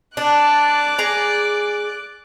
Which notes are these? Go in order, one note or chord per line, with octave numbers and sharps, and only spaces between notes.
D4 D5 D6 F#6
G#4 A#5